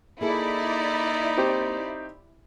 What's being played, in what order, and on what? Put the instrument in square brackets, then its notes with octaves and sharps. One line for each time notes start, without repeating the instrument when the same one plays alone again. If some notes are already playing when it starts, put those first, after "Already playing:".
[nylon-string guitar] A#3 G#4 A4 [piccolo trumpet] D#4 [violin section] E4 D5
[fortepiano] C4 G4